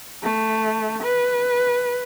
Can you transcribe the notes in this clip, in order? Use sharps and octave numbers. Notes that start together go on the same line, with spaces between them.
A3
B4